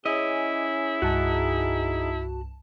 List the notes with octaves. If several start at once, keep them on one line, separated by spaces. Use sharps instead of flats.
C#4 E4 G#4 D#5
C2 G2 D#4 F#4 G#4 A5